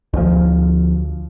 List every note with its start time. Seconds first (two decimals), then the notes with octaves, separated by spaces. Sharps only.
0.14 D2 F3